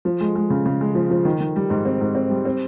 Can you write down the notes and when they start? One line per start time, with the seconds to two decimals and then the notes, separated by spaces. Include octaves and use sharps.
0.05 F3
0.20 G#3
0.35 G#3
0.50 C#3
0.66 C#3
0.81 G#3
0.95 F3
1.10 F3
1.25 D#3
1.40 D#3
1.56 G3
1.70 G#2
1.85 C4
2.01 G#2
2.15 C4
2.30 G3
2.45 C4